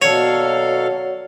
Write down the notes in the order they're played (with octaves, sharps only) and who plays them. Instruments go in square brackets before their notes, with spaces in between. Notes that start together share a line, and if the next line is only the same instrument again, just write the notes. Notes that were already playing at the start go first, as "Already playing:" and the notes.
[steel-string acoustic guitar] D#2 D4 [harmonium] B2 A4 F5 [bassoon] F#3 [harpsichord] C#5